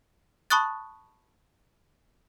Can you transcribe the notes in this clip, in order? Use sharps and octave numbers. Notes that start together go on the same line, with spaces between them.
A5 B5 C#6 D#6 F#6 A6